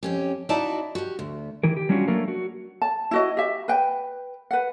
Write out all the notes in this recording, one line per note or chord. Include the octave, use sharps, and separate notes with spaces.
F2 C#4 G4
D#4 E4 F#4 D5 F5 A5
F#4 G4
D2
D#3 E3 A#4
G4
F#3 G3 C#4 D4 F4 F#4
F#3 A3 A#3 D4 A#4
F#4
A5
E4 F#4 D#5
G4 E5
B4 G5
B4 F#5